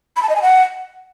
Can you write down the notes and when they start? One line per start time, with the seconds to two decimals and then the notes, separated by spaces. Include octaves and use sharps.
0.17 B5
0.23 A5
0.29 D#5
0.36 G#5
0.42 F#5